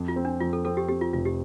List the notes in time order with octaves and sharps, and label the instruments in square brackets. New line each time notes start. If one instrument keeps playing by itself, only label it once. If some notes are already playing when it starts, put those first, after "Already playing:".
Already playing: [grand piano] F2
[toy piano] F4
[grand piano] C4
[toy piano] D4
[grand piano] F2 [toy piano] F4
[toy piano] A4
[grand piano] C4 [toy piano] A4
[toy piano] G4
[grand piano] C4 [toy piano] G4
[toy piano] F4
[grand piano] F1 [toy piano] F4
[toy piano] G4